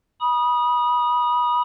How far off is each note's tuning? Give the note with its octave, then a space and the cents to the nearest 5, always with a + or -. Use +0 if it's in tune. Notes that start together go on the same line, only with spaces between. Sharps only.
B5 -30 D#6 -5